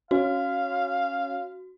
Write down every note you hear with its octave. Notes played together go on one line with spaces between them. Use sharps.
C#4 F#4 F5